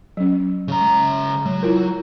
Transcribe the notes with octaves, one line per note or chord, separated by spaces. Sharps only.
F#3 C#4
C#3 A#5
G#3
F#3 G#3
E4 F4 A#4